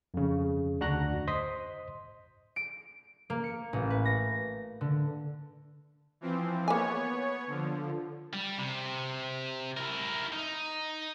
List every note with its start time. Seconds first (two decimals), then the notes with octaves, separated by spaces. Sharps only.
0.14 F2 C#3
0.80 D2 D4 F#4 A#5 F#6 A#6
1.27 C5 D#5 C6 D#6 B6
2.56 D7
3.30 A#3
3.44 C#7
3.73 A1
3.90 B4
4.05 A#6
4.81 D3
6.21 E3 F3 C4
6.68 A#3 B3 C#5 G#5
7.47 D3 F3
8.33 G3
8.58 C3
9.77 E4 A#4
10.33 D#4